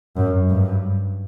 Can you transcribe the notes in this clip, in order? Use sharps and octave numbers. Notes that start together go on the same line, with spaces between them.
F#2
G2